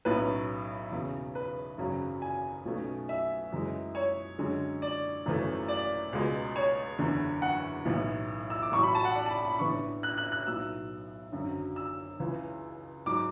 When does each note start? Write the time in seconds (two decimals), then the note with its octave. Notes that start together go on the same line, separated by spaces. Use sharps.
0.05 B1 A2 F#3 C#4 B4
0.92 E1 E2 C#3
1.35 B4
1.78 G#1 F#2 C#3 F#3 C#4
2.22 G#5
2.65 B1 B2 A3 C#4
3.09 E5
3.52 F#2 E3 G#3
3.95 C#5
4.38 F#2 D3 G#3 C#4
4.82 D5
5.26 G#1 F#2 E3 A3 C#4
5.68 D5
6.13 C#2 B2 G#3
6.56 C#5
6.99 F#1 E2 D3
7.42 F#5
7.85 B1 A2 E3
8.50 E6
8.62 D6
8.72 A1 A2 F#3 C#6
8.83 B5
8.95 A5
9.05 F#5
9.15 D5
9.26 A5
9.30 B5
9.45 B5
9.59 A1 A2 E3 B3 D4 C#6
10.03 F#6
10.18 F#6
10.32 F#6
10.46 B1 A2 F#3 B3 E6
11.32 G#1 F#2 D3 F#3
11.76 E6
12.20 C#2 C#3 E3
13.06 G#2 F#3 D6